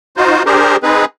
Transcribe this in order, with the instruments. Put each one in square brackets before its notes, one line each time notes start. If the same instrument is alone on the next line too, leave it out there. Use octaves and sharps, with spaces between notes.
[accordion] D#4 F4 F#4 C5
D4 G4 G#4 A#4 C5
C4 D#4 G#4 B4